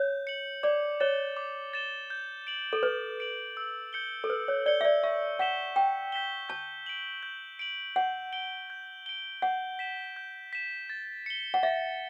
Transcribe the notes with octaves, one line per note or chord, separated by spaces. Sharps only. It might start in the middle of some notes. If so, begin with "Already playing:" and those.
Already playing: C#5 G6
C#7 F#7
D5 D6
C#5 A6 E7 G7
D6
A6 E7 G7
G6
D7 F#7
A4
B4 G6
D7 F#7
E6
G6 C#7 G7
A4
B4 E6
C#5
D5 G6 C#7 G7
E5
D5
E5 C#6
F#5 G6 B6 E7 G7
G5 C#6
G6 B6 E7 G7
A5 G6
D7 F#7
G6
D7 F#7
F#5 G6
D7 G7
G6
D7 G7
F#5 G6
B6 E7
G6
B6 E7
A6
C#7 G7
F#5
E5 A6